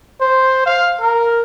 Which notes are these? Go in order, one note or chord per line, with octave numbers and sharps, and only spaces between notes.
C5
F5
A#4